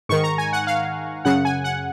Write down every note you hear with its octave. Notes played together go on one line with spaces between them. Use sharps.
G#2 D#3 C#6
A#5
G#5
F#5
F5
F#2 C#3 F#5
G#5
F#5